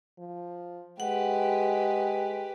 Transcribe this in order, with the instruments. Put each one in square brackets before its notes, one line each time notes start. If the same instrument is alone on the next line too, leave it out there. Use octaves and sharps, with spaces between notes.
[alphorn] F3
[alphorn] G#3 [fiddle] G4 B4 [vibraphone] F#5